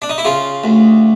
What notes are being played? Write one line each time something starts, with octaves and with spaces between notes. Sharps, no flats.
D4
D#4
E4
C#3 F4
D2